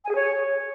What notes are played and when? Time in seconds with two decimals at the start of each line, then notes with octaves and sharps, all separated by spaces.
0.04 G#5
0.09 G#4
0.15 C#5